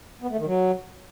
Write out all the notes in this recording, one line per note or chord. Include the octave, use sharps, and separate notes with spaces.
B3
A3
D#3
F#3